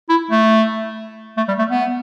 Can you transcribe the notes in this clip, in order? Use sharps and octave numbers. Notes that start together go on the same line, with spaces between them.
E4
A3
A3
G3
A3
B3